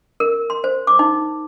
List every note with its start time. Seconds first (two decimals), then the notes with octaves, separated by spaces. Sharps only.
0.20 A#4
0.50 C6
0.64 C5
0.87 D6
0.99 D#4